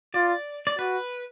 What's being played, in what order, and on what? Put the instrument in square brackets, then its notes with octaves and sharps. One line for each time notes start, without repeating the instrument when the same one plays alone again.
[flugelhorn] F4 [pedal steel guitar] D5
[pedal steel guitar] D5
[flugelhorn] F#4 [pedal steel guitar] B4